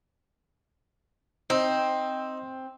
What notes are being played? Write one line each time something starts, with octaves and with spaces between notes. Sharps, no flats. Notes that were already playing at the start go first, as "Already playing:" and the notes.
C4 D#4